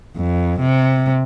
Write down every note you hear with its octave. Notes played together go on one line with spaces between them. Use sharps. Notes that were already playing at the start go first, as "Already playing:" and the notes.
F2
C3